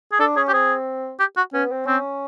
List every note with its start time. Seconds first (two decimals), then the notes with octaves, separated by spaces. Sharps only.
0.12 G#4
0.19 D4 A4
0.36 C#4 G#4
0.48 G4
0.53 C4 G#4
1.20 G4
1.37 F#4
1.53 B3 C#4
1.71 C4
1.87 C4 C#4